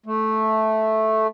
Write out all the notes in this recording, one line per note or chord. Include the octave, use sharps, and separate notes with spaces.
A3